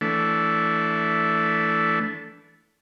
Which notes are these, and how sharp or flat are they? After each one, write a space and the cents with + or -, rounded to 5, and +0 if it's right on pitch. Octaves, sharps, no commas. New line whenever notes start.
E3 +0 A3 +0 D4 -25